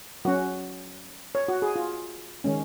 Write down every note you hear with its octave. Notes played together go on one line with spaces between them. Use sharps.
F#3 C#4 F#4
C#5
F#4
G#4
F4
D#3 G#3 C#4